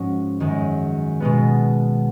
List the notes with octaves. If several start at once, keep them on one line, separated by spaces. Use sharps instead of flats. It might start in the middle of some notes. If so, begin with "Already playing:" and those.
Already playing: G#2 F3 G#3 C#4 F#4
F#2 D#3 G#3
B2 G#3 B3